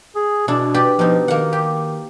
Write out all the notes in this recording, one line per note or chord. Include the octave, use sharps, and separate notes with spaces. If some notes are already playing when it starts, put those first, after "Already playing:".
G#4
B2 D4 E4
G4 B4 D5
B2 F3 D#4
D#3 A#3 F#5
G4